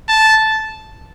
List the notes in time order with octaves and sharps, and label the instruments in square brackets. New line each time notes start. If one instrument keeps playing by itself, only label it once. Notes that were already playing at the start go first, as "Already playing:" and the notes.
[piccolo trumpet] A5